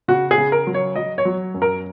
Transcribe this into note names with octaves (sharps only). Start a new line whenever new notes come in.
C#3 F#4
G#4
C#3
A#4
F#3
C#5
F#3 D#5
C#5
F#3
F#2
A#4